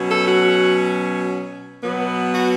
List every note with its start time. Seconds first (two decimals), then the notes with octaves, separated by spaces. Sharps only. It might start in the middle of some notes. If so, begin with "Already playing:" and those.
Already playing: B2 F#3 C#4
0.11 A4
0.27 F#4
1.83 B2 F#3 B3
2.34 F#4